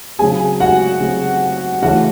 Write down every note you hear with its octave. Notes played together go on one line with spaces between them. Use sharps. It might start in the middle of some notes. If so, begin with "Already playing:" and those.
C#3 F#3 C4 G#4 G#5
F#4 F#5
C#3 F#3 C4
C#3 E3 A3 C#4 F#4 F#5